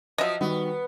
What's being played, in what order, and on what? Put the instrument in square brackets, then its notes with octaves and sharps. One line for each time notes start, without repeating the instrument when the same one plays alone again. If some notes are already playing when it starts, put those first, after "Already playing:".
[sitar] F3 F#3 [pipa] D#5 E5
[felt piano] D#3 G3 F#4 [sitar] B3